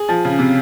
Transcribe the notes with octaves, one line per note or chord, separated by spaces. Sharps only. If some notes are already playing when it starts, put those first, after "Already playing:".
Already playing: G#4
F3
C#3
C3